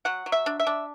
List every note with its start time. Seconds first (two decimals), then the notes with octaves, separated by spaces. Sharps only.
0.05 F#3 F#5
0.26 F#3
0.32 E5
0.46 D4
0.60 E5
0.67 D4